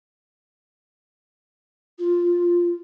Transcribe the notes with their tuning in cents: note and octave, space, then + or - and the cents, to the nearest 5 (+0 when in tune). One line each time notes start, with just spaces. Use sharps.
F4 +0